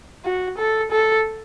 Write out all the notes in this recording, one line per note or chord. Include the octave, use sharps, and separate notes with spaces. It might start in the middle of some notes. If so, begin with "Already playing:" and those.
F#4
A4
A4